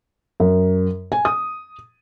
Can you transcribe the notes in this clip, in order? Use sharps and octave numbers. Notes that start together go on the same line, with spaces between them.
F#2
G#5
D#6